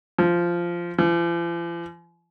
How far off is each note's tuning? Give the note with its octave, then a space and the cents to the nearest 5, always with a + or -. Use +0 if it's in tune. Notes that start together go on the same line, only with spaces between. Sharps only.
F3 -10
F3 -45